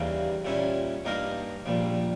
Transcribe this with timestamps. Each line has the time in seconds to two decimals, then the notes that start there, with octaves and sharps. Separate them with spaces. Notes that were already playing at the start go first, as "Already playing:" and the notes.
Already playing: D#2 C#3 E3 G3 A#3
0.45 A#2 G3 C#4 E4
1.05 G2 G3 A#3 D#4 A#4
1.66 A#1 A#2 G3